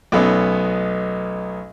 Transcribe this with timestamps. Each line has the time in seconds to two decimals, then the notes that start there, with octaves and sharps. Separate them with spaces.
0.12 B1 A3 B3 C#4 D#4